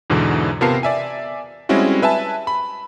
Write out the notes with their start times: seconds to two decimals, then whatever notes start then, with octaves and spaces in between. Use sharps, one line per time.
0.10 E2 G#2 B2 D3 E3
0.61 C3 B3 F4 A#4 A5 C7
0.83 D5 E5 G#5
1.69 G3 G#3 C4 C#4 E4 F#4
2.02 B4 E5 G#5 A5
2.47 B5